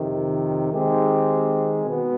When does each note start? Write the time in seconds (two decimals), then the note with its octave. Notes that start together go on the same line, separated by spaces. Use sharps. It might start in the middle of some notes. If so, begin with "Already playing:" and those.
Already playing: F2 C3 D#3
0.72 D#3 G#3 C4 G4
1.85 B2 B3